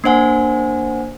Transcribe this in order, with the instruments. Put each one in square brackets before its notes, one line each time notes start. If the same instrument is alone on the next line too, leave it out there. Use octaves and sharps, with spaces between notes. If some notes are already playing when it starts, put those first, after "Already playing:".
[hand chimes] A#3 D4 C5 F#5 G#5